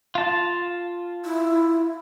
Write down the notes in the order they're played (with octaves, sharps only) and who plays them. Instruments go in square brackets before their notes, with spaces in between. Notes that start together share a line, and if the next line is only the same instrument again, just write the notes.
[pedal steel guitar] F4 A5
[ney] E4